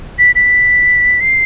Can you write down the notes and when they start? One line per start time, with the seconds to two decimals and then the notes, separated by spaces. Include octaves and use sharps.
0.19 B6
0.35 B6
1.21 C7